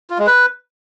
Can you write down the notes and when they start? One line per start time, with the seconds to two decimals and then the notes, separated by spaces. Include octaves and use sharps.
0.10 F4
0.18 G#3
0.27 B4